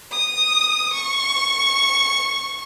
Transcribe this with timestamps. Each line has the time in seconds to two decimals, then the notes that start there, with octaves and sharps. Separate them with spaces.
0.12 D#6
0.94 C#6